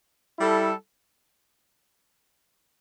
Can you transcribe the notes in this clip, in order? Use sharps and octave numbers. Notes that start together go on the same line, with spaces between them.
G3 E4 A4